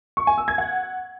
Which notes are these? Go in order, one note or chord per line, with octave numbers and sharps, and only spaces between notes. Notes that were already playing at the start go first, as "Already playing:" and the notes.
C#6
G#5
E6
G#6
F#5